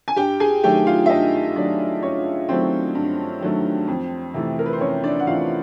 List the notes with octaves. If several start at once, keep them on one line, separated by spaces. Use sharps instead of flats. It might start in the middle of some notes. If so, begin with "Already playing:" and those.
G#5
G2 G4 G5
G#4 G#5
D#3 F#3 A3 G4 G5
F4 F5
E5
G2 D#4 D#5
D#3 F#3 A3 D4 D5
G2 C#4 C#5
D#3 F#3 A3 C4 C5
G2
D#3 F#3 A3
F2
C3 E3 A3
A#4
B4
C5
F2 C#4 C#5
D4 D5
F#5
C3 E3 A3 F4 F5